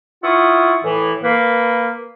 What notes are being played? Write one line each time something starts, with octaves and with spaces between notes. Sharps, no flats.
E4 F4 F#5 C#6 D#6
A2 E3
A#3 B4